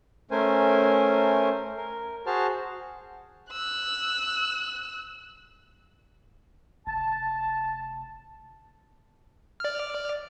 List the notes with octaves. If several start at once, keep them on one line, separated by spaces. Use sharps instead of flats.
A3 C#4 A#4 C5 G#5
A#4
F#4 G#4 C5 A5 F6
E6 F#6
F1 A5
D5 F6